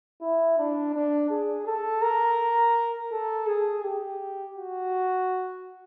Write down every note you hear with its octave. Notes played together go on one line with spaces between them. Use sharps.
E4
D4
D4
G#4
A4
A#4
A4
G#4
G4
F#4